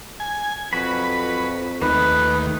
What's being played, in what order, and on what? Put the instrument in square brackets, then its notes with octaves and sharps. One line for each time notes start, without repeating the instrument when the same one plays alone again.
[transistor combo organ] G#5
[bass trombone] F2 [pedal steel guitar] F#3 F#4 B5 [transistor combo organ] B4
[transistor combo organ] D#2 [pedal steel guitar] A3 A#3 [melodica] B4